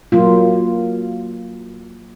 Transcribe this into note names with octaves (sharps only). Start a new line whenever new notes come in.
F#3 A#3 F4